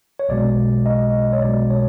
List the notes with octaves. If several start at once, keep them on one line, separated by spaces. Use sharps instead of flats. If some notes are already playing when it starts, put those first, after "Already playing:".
C#5
B1 B2 G#3 D5
D#5
C#5
B1 B2 G#3 D5
C#5